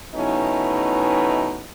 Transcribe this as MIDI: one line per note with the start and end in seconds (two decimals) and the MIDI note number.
0.15 1.62 47
0.15 1.62 52
0.15 1.62 57
0.15 1.62 61
0.15 1.62 63